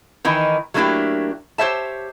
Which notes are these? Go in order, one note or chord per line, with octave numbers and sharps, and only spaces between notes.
D#3 E3 D#4 E4
F#3 A3 A#3 D4 E4 G4
G4 C5 C#5 E5 A5